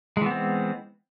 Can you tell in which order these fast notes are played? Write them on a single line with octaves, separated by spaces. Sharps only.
G#3 E3 B3 C4